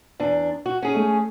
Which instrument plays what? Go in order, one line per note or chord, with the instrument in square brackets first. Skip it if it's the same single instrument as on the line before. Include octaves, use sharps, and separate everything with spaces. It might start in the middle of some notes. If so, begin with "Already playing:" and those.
[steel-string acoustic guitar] E2 D4
F#4
C#4 G#4
[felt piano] A3